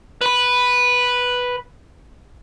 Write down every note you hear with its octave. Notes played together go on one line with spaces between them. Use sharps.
B4 B5